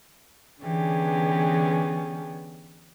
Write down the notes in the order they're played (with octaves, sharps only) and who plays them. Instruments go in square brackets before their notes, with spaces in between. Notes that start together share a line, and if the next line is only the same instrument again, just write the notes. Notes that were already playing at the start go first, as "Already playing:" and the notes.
[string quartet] D3 E3 B3 C#4 G4 G#4